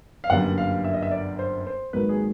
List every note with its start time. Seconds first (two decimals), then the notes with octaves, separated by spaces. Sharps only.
0.24 F5
0.30 G1 F#2 D3 G3 A#3 F#5
0.58 F5
0.84 E5
0.94 D#5
1.03 E5
1.11 D5
1.39 C5
1.67 C5
1.93 G#1 G#2 D#3 F#3 A#3 B4
2.09 G#4